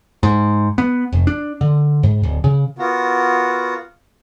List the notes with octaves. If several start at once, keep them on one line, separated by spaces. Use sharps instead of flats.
G#2
B3
F1
D4
D3
G#2
D1
C#3
B3 F4 F#4 A#4